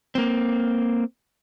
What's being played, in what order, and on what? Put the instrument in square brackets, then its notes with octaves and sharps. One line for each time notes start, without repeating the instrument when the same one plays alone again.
[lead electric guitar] A#3 C4